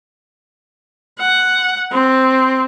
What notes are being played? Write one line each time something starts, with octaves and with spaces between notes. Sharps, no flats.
F#5
C4